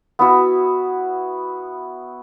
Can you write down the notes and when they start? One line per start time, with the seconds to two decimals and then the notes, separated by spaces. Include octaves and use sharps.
0.19 B3 E4 F#4